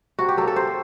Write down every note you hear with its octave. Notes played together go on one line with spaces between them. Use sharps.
C3 F#4
G4
F#3 A#3 A4
A4
C3 C5